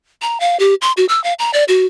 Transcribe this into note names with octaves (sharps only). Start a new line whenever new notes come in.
A#5
F5
G4
C6
F#4
E6
F5
A#5
D5
F#4